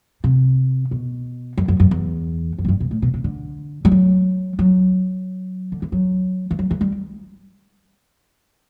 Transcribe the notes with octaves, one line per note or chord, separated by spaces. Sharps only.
C3
B2
F#2
F#2
F#2
E2
F#2
A2
G2
B2
A2
B2
C3
D3
G3
F#3
F#3
D3
E3
F#3
E3
F#3
E3
G3